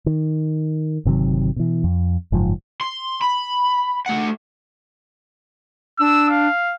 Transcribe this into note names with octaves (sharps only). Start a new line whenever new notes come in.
D#3
G1 C3 D#3 F#3
B2 E3
F2
F#1 G#2 F3
C6
B5
A3 F#5
D4 E6
F5